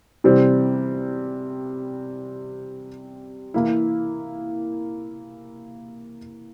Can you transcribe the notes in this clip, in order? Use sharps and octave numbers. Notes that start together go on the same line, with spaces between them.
C3 E3 G3 C4
E3 A#3 E4